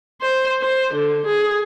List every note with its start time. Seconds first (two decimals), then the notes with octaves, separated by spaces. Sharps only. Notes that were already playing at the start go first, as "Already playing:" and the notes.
0.22 C5
0.61 C5
0.94 D3
1.26 G#4